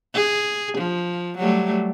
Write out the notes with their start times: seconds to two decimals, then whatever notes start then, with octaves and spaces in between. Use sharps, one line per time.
0.15 G#4
0.78 F3
1.38 F#3 G3 A3